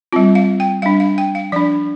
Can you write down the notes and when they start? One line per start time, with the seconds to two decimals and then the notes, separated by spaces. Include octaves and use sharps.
0.12 G3 C4 F4
0.35 F5
0.60 G5
0.82 G3 D4 F5
1.00 F5
1.18 G5
1.35 F5
1.52 F3 D5
1.56 D4